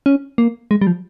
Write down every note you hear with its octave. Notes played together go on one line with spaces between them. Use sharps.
C#4
A#3
G#3
G3
F3